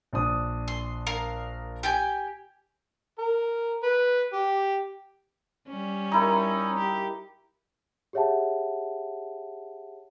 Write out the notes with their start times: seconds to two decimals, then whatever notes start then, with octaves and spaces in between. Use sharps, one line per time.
0.13 A#1 D4 D#6
0.68 C6
1.07 A#4 F5
1.83 G4 G5 G#5
3.19 A#4
3.83 B4
4.33 G4
5.68 G3 C#4
6.12 D#4 E4 A#4
6.78 G4
8.13 G4 G#4 C#5 E5 F#5 A5